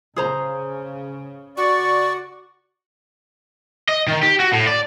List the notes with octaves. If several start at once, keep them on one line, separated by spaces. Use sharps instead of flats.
C#3 G#4 C5 A#5
F#4 D5 C#6
D#5
D#3
G4
F#4
A2
D5